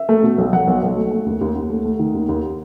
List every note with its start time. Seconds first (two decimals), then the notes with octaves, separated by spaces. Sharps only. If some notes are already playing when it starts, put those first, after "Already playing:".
Already playing: E5
0.09 A3
0.23 B2
0.38 B1
0.53 F#3 F#5
0.68 B1
0.83 B1
0.96 A3
1.11 A3
1.26 D#2
1.41 D#2
1.55 D#2
1.70 A3
1.85 A3
1.99 D#3
2.14 D#2
2.29 D#2